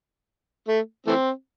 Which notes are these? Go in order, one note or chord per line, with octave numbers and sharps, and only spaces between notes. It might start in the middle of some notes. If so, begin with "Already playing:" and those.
A3
E3 A3 C4